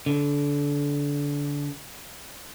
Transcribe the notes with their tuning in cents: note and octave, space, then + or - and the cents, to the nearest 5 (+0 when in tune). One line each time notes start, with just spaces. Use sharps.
D3 -25